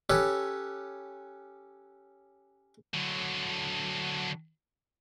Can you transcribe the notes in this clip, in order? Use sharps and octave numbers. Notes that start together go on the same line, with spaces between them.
C#4 G4 A4 B4 C#5
D3 F#3